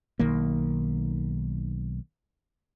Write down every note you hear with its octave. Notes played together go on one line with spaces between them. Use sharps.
B1 D#3 A#3